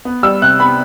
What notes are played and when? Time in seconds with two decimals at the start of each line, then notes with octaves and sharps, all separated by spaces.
0.05 B3
0.23 G3 E6
0.42 C3 F#6
0.60 B3 B5